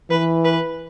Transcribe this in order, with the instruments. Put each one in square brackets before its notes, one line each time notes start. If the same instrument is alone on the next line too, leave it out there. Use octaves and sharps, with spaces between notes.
[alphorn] E3 [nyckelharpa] B4
[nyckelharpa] B4